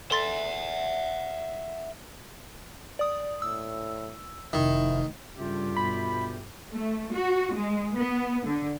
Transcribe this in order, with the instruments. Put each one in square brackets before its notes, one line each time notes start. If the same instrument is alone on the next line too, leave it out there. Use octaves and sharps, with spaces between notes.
[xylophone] A4 C6 A6 [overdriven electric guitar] E5 F#5
[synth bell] D5 D#6
[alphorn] A2 [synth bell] E6
[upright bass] F1 [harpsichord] D#3 [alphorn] E4
[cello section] G2 [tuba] C#3 [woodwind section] A3 F4 G4
[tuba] B2 [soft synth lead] B5
[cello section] A3
F#4
G#3
B3
D3